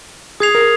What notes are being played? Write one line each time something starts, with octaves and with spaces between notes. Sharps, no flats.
G#4 D#6 G#6 C7 F7
A#4